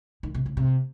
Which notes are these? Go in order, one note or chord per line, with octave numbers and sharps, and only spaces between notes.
D#3
C3
C#3
C3